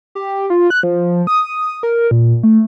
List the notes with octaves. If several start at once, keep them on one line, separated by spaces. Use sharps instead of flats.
G4
F4
F#6
F3
D#6
A#4
A#2
A3